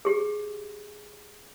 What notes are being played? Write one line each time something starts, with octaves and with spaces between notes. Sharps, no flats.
G4 G#4